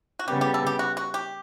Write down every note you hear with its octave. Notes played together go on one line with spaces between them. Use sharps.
F#4
C#3 G3 B3 G4
G4
A4
G4
F#4
F#4
G4